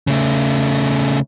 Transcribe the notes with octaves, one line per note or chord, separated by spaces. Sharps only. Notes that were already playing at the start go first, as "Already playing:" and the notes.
C#3 A3